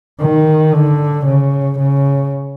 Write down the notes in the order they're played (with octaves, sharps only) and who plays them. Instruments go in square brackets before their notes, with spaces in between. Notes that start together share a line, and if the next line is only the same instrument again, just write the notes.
[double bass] D#3
D3
C#3
C#3